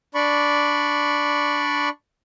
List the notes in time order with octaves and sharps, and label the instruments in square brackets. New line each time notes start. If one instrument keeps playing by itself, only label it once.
[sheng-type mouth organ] D4 D5 B5 C#6